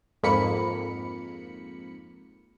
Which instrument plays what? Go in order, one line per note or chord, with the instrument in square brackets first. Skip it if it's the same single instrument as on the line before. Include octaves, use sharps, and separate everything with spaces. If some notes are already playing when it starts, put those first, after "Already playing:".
[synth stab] F2 G#2 A#3 B5 C#7